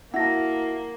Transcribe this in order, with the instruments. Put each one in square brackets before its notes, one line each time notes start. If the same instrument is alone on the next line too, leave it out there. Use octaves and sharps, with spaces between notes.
[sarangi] A#3 [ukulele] E4 F#4 A5 [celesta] F#5 A#6